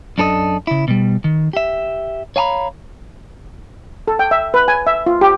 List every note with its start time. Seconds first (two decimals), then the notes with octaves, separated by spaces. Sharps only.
0.18 F#2 D4 A4 A#4 D#5
0.67 C#3 E4
0.88 B2 G3
1.24 D#3
1.53 G4 E5
2.36 C#5 F5 G#5 A#5 B5
4.08 A4
4.19 G5
4.31 E5
4.54 B4
4.68 G#5
4.87 E5
5.06 F4
5.21 G4